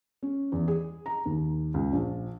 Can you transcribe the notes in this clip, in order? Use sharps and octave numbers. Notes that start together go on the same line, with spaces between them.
C#4
E2
G#4
A#5
D#2
C#2
A#1